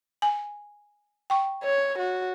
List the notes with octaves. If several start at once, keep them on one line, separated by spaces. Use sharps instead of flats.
G#5
G5 C#6
C#5
F#4